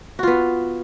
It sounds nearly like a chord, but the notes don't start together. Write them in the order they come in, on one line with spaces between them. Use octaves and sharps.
F#4 F4 B3